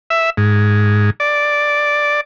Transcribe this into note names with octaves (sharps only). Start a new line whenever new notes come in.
E5
G#2
D5